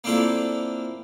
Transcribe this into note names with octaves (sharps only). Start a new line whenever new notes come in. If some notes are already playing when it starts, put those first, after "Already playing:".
A#3 C4 D4 E4 F4 A4